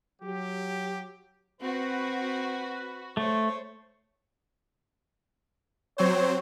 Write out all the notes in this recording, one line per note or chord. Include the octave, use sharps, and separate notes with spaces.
F#3 G4
C4 F#4 B4
A3 C5 C#5
F#3 C4 C5 C#5